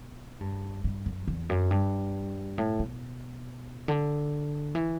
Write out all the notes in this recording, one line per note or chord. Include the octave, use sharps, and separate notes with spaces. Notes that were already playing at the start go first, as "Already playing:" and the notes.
Already playing: B2
G2
G2
F#2
E2
F#2
G2
A2
B2
D3
E3